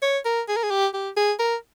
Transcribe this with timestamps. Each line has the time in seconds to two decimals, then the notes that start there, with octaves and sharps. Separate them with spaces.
0.02 C#5
0.25 A#4
0.48 G#4
0.56 A#4
0.63 G#4
0.71 G4
0.94 G4
1.17 G#4
1.39 A#4